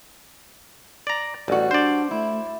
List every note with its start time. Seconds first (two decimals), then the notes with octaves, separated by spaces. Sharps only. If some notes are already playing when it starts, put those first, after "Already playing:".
1.07 D5 A#5
1.48 A1 G3 F#4 D5
1.71 D4 C5 D5
2.11 A3 E4